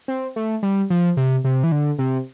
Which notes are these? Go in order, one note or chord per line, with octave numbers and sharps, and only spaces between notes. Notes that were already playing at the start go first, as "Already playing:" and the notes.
C4
A3
G3
F3
C3
C3
E3
D3
C3